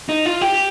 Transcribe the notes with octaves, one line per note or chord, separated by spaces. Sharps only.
D#4
F4
G4